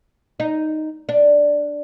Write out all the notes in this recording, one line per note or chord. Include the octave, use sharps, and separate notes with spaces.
D#4
D4